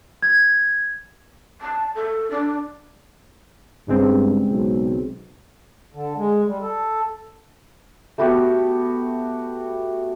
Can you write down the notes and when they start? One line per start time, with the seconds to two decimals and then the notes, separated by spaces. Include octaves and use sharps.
0.22 G#6
1.61 A5
1.95 A4
2.31 D4
3.88 G2 C#3 G#3 C4
4.48 B1
5.94 D3
6.17 G#3
6.47 G3
6.62 A4
8.18 A3 B3 F#4 G4